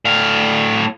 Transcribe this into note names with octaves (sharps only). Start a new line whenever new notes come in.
A2 F5